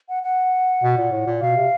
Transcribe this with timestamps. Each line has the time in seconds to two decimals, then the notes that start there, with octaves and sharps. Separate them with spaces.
0.09 F#5
0.23 F#5
0.83 B2
0.97 A#2
1.11 A2
1.27 A#2
1.41 B2 F5
1.56 C3